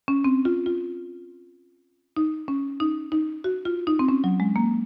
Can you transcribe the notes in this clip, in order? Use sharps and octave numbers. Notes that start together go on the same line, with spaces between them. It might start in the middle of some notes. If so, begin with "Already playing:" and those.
C#4
C4
F4
F4
D#4
C#4
D#4
D#4
F#4
F4
D#4
C4
C#4
F#3
G#3
A#3